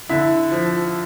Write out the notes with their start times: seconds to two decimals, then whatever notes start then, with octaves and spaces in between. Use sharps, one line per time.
0.09 D3 E4 E5
0.51 F3